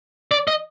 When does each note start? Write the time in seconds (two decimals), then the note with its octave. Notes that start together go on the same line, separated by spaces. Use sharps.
0.31 D5
0.48 D#5